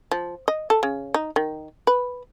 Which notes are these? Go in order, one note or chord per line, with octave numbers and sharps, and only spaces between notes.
F3
D#5
A4
C#3
D#4
D#3
B4